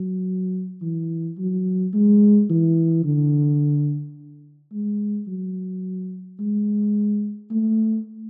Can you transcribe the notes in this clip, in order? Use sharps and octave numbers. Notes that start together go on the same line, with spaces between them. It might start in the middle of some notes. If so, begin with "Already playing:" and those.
Already playing: F#3
E3
F#3
G#3
E3
D3
G#3
F#3
G#3
A3